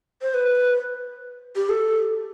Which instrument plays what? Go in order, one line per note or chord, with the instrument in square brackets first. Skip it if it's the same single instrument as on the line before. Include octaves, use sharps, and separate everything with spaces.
[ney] C5
B4
G4
A4